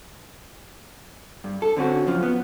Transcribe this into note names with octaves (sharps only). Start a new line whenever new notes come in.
G2
A4
D3 C4 C#4 F#4
F#2 C#3 F3
B3